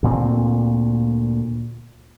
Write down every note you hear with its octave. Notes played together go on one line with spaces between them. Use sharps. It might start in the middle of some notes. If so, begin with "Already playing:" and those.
D2 A#2 G3 C4